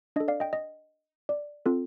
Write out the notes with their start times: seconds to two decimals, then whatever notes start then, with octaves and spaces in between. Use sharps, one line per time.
0.16 D4 D#5
0.20 A4
0.28 D5 F5
0.40 D#5 G5
0.53 D#5
1.29 D5
1.66 C4 F4 A4